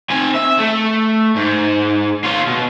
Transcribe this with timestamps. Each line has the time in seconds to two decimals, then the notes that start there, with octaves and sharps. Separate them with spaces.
0.10 C4 G#5
0.35 E5
0.59 A3
1.36 G#2
2.24 F4 C#5
2.47 B2